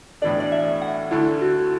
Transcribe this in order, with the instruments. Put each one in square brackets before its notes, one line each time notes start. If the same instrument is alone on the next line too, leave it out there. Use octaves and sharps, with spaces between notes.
[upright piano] B1 A2 E3 D4 [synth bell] D5
[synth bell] D5
E5
F#5
[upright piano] D2 D3 A3 [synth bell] E4
[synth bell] F#4